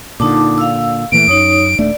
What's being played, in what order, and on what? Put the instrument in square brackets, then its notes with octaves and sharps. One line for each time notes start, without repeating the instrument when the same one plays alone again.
[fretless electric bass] A#2 D3 [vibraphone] D#4 A5 D6
[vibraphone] F5 E6
[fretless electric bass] A#2 E3 A3 [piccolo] D7
[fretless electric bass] F#2 [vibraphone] D#4 C#5 D#6
[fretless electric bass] D#1 A3 D4 [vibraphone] D5